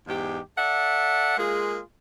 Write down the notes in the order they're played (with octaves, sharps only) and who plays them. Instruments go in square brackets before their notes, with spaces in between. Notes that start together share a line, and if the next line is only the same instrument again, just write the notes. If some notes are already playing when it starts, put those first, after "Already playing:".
[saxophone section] E2 G#2 G4
A4 D5 E5 F#5
G#3 A#3 F4 G#4